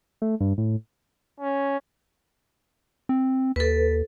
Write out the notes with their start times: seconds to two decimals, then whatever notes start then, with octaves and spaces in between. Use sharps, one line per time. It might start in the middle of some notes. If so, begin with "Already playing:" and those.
0.22 A3
0.41 G2
0.58 A2
1.40 C#4
3.09 C4
3.56 D#2 A4 B4